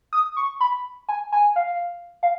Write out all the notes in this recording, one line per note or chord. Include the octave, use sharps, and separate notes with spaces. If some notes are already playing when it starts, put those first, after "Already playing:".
D#6
C#6
B5
G#5
G#5
F5
F5